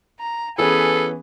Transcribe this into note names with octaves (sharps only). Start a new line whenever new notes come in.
A#5
E3 B3 C#4 G#4 A4 B4